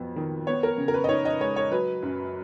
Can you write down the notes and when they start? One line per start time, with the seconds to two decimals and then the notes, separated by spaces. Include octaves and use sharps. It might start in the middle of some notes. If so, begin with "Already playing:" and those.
Already playing: F2 F#3 B3
0.16 D#3
0.47 B3 C#5
0.63 A#4
0.78 C#3
0.88 A#4
0.94 B4
1.04 D#5
1.09 D#4 C#5
1.25 D#5
1.41 G#3 C#5
1.56 C#5
1.71 F#3 B4
2.02 F#2